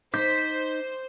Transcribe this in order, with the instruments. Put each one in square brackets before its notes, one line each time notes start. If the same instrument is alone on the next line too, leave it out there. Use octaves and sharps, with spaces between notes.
[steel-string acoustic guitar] D#4 [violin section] C5 [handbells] D6 G6 [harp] B6